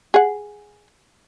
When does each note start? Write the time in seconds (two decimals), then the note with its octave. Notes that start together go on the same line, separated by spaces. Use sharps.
0.14 G#4 F#5